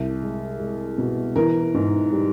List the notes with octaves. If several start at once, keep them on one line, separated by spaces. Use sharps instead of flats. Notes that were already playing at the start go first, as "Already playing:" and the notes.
Already playing: C2
G#3
G#3
B2
E3 A#4
G#2
G3